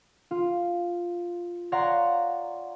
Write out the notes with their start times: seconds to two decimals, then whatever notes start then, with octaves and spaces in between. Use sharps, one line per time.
0.31 F4
1.72 C#5 D5 F5 F#5 A#5 C6